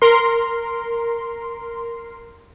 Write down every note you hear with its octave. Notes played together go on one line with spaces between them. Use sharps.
A#4 C6